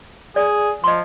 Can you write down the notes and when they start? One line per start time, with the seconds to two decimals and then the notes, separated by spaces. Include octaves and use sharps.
0.36 G#4 D5
0.84 F3 D#5 C6